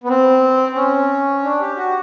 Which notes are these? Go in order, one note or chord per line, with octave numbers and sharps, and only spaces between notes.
B3
C4
C4
C#4
D4
G4
F#4